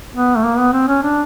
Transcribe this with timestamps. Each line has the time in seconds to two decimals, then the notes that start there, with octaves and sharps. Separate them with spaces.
0.14 B3
0.36 A3
0.44 A#3
0.58 B3
0.73 C4
0.88 C#4
1.03 D4